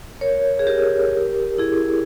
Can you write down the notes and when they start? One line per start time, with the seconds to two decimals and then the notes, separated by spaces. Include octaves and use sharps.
0.21 A#4 C#5
0.59 G#4
0.67 G4 A#4
1.58 E4 G#4